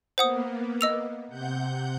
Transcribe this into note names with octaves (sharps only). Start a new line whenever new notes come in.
A#3 B3 C5 F#5 D#6
D#5 E6 F7
C3 F#5 G6